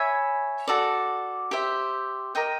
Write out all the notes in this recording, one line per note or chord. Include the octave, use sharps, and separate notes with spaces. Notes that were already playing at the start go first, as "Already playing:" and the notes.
Already playing: C#5 E5 G#5 B5
F#4 A4 D5
G4 C5 E5
A#4 D#5 G5